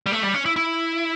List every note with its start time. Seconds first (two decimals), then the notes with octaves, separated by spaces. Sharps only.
0.06 G3
0.12 A3
0.23 G3
0.34 C#4
0.46 E4
0.56 E4